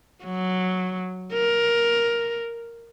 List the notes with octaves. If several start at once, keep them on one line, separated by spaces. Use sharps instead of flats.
F#3
A#4